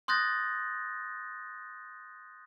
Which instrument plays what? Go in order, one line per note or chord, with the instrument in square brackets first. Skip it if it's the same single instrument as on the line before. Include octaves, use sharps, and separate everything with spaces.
[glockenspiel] C6 D#6 F#6 G6 A6 A#6